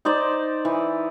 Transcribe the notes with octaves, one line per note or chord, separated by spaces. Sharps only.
D#4 C5 D5
E3